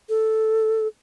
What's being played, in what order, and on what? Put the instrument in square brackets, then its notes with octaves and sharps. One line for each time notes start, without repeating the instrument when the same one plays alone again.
[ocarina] A4